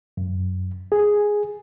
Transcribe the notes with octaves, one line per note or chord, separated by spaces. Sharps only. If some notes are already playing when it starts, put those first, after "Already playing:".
F#2
G#4